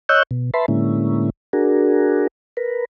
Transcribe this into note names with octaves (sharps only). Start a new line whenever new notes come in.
C#5 D#5 C#6 E6 F#6 G6
B2
B4 E5 A5 B5 C6
A2 D3 G#3 A#3 C#4 E4
D4 F#4 G#4 A#4
A#4 B4